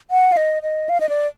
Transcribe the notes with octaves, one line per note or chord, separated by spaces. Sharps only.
F#5
F5
D#5
D#5
F5
D#5
D5